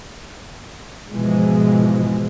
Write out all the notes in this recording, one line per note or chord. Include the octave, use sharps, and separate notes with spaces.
G#2 B2 E3 F3 G#3